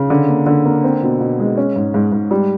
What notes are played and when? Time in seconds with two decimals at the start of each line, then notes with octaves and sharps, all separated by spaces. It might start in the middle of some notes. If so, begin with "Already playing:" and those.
Already playing: C#3
0.10 D3
0.29 A#3
0.46 D3
0.65 A#3
0.84 C4
1.03 B2
1.20 B2
1.39 G#3
1.57 C#4
1.76 G#2
1.94 G#2
2.12 G#2
2.31 G3